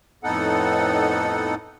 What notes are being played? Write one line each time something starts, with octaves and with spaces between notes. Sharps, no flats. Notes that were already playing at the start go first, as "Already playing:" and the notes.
F2 A2 B3 D#4 A4 F#5